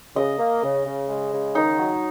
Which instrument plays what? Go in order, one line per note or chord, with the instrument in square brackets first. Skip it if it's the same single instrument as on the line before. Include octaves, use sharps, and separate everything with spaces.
[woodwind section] C#3 [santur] D#5
[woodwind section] A#3
C#3
C#3
G#3
C#3
[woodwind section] D#3 [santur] D#4
[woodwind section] F#3